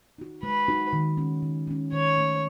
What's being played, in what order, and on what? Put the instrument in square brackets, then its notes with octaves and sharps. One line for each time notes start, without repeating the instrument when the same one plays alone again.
[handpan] D#4 F#4
[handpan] G#3 [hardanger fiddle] B4
[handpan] D#4 F#4
D#3
G#3 C#4
D#3
G#3 C#4
[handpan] D#3 [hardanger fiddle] C#5
[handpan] A3 C#4